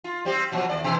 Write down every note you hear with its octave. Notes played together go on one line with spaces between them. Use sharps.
F4
G3 C4 G4
A#2 F3 F#3
D#2 D5
B2 E3